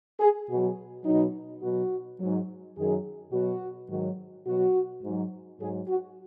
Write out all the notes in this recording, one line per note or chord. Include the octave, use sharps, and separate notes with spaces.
G#4
B2 F#3 F#4
B2 F#3 D#4
B2 F#3 F#4
G#2 F#3
F#2 D#3 F#3 G#4
B2 F#3 F#4
G#2 D#3 F#3
B2 F#3 F#4
G#2 F#3
G#2 F#3 G#4
F#4